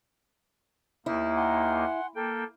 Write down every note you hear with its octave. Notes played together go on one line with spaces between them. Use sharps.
D#2 A#3 D#4 E4
F#5 G#5 C6
A#3 A4 G5